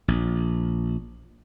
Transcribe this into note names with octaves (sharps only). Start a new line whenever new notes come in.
A#1